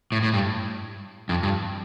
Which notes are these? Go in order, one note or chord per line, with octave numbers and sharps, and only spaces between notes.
A2
A2
G2
F2
G2